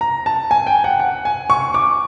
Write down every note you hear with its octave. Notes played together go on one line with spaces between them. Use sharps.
A#5
A5
G#5
G5
F#5
F#5
G#5
C#6
D6